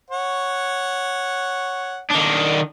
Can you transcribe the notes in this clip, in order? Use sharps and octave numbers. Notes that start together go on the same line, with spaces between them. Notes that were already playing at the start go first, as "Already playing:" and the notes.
C#5 F#5
D#3 D4